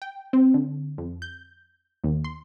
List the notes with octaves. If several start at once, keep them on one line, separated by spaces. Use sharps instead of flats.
G5
C4
D3
F2
G6
D#2
C6